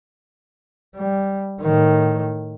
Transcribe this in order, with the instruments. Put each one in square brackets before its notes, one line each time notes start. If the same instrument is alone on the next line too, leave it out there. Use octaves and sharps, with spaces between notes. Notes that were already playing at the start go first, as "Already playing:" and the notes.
[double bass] G3
A2 D#3